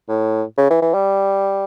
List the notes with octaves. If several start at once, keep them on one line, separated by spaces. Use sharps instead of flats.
A2
C#3
E3
E3
G3